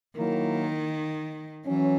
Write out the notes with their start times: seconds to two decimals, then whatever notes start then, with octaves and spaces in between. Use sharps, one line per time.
0.17 D#3 F#3 A#3 E4 A#4
1.66 E3 F#3 C#4